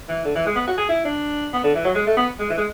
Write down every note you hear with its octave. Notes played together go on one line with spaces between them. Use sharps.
E3
D3
E3
G#3
B3
F#4
G#4
E4
D4
B3
D3
E3
F#3
G#3
A3
B3
G#3
E3
G#3